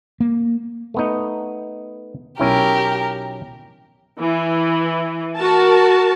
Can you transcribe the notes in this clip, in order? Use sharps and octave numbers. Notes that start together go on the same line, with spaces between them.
A#3
A3 B3 D#4
B1 C#4 E4 G4 A#4
E3
F#4 A#4 A5